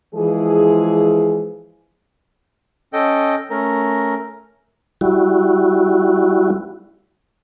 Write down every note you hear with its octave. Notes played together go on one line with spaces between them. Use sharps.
E3 F3 G#3 E4 G#4
C#4 A4 D#5 G5
A3 C#4 A#4
G3 E4 F#4